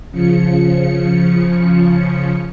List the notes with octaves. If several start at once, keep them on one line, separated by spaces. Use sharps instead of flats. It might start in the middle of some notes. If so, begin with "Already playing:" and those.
C#3 F3 C#7